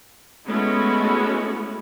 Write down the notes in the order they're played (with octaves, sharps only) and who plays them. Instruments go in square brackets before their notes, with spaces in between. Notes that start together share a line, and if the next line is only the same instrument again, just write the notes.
[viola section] G#3 A3 B3 C#4 E4 F#4